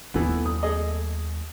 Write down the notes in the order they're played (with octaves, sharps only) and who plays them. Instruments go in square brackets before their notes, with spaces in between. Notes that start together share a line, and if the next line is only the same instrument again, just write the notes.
[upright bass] D#2 F#3 [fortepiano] E3 A3 B3
[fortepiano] D#6
A3 G#4 D#5